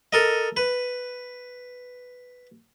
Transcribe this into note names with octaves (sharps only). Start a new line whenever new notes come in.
A4 A#4 D#5
B4